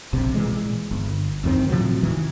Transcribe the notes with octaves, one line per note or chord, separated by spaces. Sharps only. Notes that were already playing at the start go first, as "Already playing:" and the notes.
A#1 C3
A#2 E3 G#3
G1
A1 F#2 D#3 C4
A2 C3 F3 F#3
C3 D#3 E3